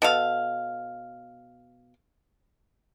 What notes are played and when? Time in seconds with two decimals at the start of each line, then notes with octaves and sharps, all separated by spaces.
0.02 B2 A4 F5